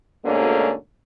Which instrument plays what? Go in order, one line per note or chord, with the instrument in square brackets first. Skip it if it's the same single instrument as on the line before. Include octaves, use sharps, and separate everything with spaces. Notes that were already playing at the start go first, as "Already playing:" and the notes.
[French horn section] D2 G#2 B2 D3 A#3 C#4